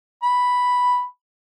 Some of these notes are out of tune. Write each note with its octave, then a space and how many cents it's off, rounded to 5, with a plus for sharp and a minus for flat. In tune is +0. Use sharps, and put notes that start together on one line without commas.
B5 +0